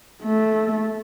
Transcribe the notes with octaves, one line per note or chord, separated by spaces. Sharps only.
A3